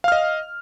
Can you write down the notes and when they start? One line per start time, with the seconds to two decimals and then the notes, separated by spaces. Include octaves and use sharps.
0.04 F5
0.08 F6
0.12 D#5